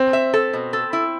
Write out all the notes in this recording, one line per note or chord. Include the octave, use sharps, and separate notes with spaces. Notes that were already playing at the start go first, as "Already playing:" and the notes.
Already playing: C4
E5
A4
B2
A4
E4